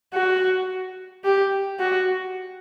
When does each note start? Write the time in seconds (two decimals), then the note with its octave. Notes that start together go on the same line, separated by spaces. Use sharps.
0.14 F#4
1.24 G4
1.80 F#4